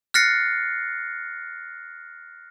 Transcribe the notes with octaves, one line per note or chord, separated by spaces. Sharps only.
F6 F#6 A6 A#6 C7 C#7